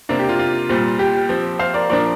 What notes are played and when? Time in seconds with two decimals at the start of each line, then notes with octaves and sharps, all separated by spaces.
0.09 C3 A#3 D4
0.19 G4
0.29 F4
0.39 F4
0.69 A#2 G3 C4
0.99 G4
1.29 F3 C4
1.59 C5 F5
1.74 A#4 D5
1.90 A#2 F3 D4 A#4 D5